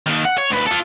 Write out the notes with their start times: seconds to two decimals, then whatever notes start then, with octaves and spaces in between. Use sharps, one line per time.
0.07 D#2 D#3
0.25 F#5
0.38 C#5
0.50 D2 B4
0.67 F4 A4